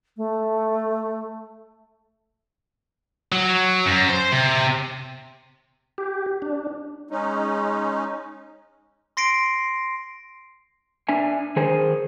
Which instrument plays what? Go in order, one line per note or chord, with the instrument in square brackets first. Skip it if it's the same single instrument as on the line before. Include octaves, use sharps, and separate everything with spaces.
[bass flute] A3
[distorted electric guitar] F#3
F#2
C5
C3
[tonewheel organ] G4
D4
[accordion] G#3 C#4 D#4
[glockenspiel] C6 A#6 C7 D7
[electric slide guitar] D4 E5 G#5
D#3 G#4 C5 G#5